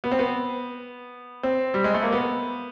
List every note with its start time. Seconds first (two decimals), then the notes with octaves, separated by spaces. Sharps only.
0.04 B3
0.11 C4
0.19 B3
1.43 C4
1.74 G3
1.84 G#3
1.94 A3
2.03 A#3
2.12 B3